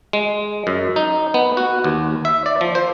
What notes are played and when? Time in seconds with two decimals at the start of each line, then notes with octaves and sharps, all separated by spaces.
0.13 G#3
0.67 F#2
0.96 D#4
1.34 B3
1.57 F#4
1.84 D#2
2.25 E5
2.46 D5
2.61 F3
2.75 C5